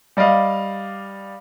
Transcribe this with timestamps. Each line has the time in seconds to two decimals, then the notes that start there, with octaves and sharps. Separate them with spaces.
0.17 G3 D5 D#5 F5